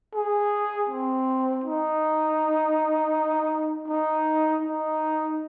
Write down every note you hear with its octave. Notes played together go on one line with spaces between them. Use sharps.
G#4
C4
D#4
D#4
D#4